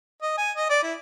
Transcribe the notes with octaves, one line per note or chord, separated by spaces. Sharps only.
D#5
G#5
D#5
D5
E4